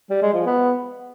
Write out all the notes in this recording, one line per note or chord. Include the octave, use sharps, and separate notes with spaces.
G3
G#3
F3
B3